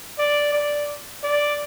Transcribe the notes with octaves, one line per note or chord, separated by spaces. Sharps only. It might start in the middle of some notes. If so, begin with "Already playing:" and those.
D5
D5
D5